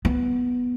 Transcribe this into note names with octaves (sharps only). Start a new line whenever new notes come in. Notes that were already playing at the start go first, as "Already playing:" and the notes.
B3